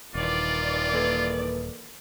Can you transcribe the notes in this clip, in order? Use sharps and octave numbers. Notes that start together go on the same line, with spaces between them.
D#1 D#3 E3 F4 D5
A#3 A4 B4